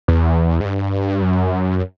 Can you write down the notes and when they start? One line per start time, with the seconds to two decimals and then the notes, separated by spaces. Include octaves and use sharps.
0.08 E2
0.60 G#2
0.65 G2
1.22 F#2